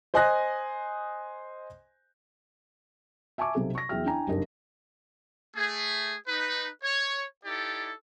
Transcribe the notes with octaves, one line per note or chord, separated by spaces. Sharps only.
C5 D#5 G#5 D#6 F#6 A#6
E5 G#5 A5 C#6 D6
B1 C3 F#3 A4
C#6 A#6
E2 F#3 G#4 E5 G5 F6
D4 E4 G5 G#5 A#5
F#1 C2 G2 D4 D#4 A#4
A3 G#4
D#4 B4
C#5
D#4 E4 G4 A4 D5